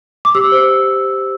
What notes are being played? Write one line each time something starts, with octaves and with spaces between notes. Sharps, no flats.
D6
G4 E6
C5